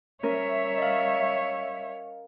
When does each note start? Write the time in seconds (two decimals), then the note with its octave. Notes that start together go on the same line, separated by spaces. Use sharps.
0.23 G3 C#4 A#4 C#5 E5
0.78 D#5 F5